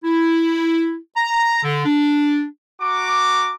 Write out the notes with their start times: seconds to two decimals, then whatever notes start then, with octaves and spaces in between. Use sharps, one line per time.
0.04 E4
1.16 A#5
1.64 D3
1.85 D4
2.81 F#4 A#5 D6